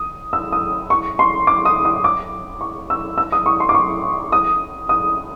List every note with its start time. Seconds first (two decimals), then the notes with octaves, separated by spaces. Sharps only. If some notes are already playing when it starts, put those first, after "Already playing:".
Already playing: D#6
0.33 E6
0.52 D#6
0.90 C#6
1.19 C6
1.47 D6
1.65 D#6
1.85 D#6
2.04 D6
2.61 C#6
2.90 E6
3.18 E6
3.32 D#6
3.46 C#6
3.60 C6
3.69 D6
3.74 C#6
4.32 D#6
4.89 D#6